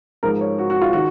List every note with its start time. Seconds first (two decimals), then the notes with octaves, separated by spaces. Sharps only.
0.23 G#2 F3 A#4
0.41 C#5
0.59 F#4
0.70 F#4
0.81 F4
0.93 D#3 F#4